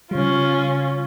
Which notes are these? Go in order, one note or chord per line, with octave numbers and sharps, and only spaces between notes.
C#3 G3 C#4 F4